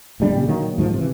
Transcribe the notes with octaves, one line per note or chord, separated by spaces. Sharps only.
D1 D#2 G3 D4
A#2 C#3
D#3 F#3 A#3
G#2 D#3 F3
C3 E3